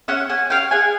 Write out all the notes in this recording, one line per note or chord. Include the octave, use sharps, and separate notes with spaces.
C#4 E5 F#5
C#4 F#5 G#5
C#4 F5 G5
G#4 F#5 G#5